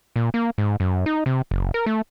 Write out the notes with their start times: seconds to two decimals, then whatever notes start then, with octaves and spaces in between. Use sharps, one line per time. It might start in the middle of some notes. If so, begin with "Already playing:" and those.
0.16 A#2
0.34 A#3
0.58 G#2
0.80 F#2
1.06 D#4
1.26 C3
1.51 F#1
1.74 A#4
1.86 A3